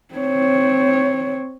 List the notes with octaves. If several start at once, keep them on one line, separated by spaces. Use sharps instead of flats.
C4 C#5